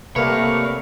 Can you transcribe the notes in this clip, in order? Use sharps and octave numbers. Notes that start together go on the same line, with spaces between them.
C3 G3 A3 A#3 A#4 B4 C#5 F5